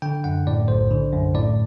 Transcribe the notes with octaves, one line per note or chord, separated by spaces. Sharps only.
D3 G5
F#2 F#5
A2 D5
B1 C5
D3
F#2
A2 D5